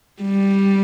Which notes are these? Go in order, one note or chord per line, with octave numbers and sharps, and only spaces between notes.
G3